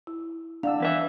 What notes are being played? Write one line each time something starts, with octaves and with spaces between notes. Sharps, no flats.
E4
D4 F5 F#5 E6
E2 B4 E5